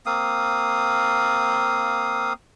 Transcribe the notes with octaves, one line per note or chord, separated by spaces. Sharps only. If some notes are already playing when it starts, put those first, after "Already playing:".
A#3 C4 F5 D#6